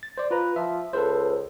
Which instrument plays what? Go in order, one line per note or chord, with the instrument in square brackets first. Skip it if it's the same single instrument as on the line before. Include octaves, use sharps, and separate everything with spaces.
[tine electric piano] A6
C5 D5
[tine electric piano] F4 A#5 [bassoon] B4
[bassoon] F3 [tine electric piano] E5
[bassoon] C#2 [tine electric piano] A4 B4 C5